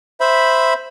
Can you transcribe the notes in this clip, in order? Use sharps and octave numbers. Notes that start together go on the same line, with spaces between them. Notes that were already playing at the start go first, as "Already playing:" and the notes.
C5 E5 B5